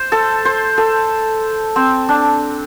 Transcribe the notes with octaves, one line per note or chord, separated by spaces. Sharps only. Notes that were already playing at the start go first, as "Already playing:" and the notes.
Already playing: C5
A4
C5
A4
C4
D4